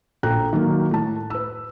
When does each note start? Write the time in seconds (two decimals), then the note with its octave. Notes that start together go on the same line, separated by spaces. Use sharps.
0.23 A#1 A4 G5 A#5 F#6
0.53 D#3 F#3 A#3
0.91 A2 A5
1.30 B4 E6